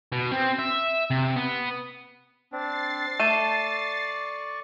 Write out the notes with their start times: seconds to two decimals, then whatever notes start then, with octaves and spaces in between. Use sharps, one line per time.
0.12 B2
0.31 C4
0.59 E5
1.11 C3
1.36 B3
2.52 C4 D4 A6 C7
3.20 A3 D5 C#6 D#7 E7